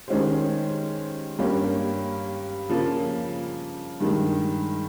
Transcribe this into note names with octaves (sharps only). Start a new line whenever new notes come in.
D#3 G#3 C#4 G4 C5
G2 G3 A#3 C#4 G4
C#3 F3 A#3
G2 D#3 G#3